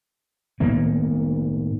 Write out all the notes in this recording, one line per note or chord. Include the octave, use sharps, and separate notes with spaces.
A2 D#3 A#3 B3